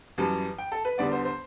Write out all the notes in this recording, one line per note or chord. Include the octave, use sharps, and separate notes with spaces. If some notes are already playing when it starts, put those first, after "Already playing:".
F#2 E3 G3 A5
G5
A4
B4
E2 D3 G3 B3 D5
C5
C5